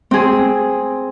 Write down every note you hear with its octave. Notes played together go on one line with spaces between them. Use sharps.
C4 G#4